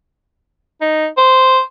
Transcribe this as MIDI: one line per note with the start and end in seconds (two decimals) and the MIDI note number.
0.81 1.07 63
1.17 1.61 72